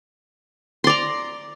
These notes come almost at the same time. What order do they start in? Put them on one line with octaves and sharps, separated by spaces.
C6 D5 A#5